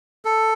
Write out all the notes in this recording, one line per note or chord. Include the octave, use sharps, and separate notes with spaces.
A4